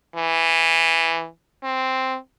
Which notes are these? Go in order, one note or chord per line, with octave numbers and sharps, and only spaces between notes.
E3
C4